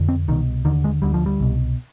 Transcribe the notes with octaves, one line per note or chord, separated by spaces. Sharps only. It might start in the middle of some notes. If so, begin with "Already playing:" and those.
Already playing: F2 D3
C4
C2 B2 D#3
D#2 D3 D#3
G#3
D2 D3 G3
F3
G3
C2 B2